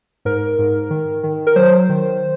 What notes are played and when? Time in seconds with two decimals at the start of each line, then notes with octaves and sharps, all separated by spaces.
0.25 G#2 A#4
0.59 G#2
0.90 D#3
1.23 D#3
1.47 A#4
1.56 F#3 C5
1.89 D#3